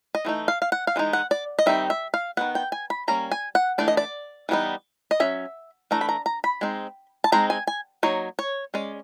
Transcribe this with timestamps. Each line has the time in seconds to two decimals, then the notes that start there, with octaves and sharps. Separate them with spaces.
0.15 D#5
0.25 E3 A3 D#4
0.48 F5
0.62 F5
0.72 F#5
0.87 F5
0.96 E3 G#3 D#4
1.13 F#5
1.31 D5
1.59 D#5
1.66 D#3 G3 C4 D#4 E5
1.90 E5
2.14 F5
2.37 D#3 G#3 B3 F#5
2.55 G5
2.72 G#5
2.90 B5
3.08 G3 A#3 C#4 A#5
3.31 G#5
3.55 F#5
3.78 E3 A3 D4 D5
3.88 D#5
3.97 D5
4.49 E3 G3 B3 D#4
5.11 D#5
5.20 F#3 A#3 C#4 E5
5.91 E3 A3 D4 A#5
6.01 B5
6.09 A#5
6.26 A#5
6.44 B5
6.61 G#3 C4 D#4
7.24 A5
7.32 G#3 C4 D#4 A#5
7.50 G#5
7.67 G#5
8.03 F#3 A#3 D#4 C#5
8.39 C#5
8.74 G#3 C#4 D5